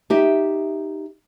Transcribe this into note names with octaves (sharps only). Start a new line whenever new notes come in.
D#4 G4 E5